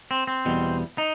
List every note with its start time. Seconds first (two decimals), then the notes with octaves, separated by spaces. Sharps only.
0.11 C4
0.27 C4
0.45 E2 B2 G3
0.98 D#4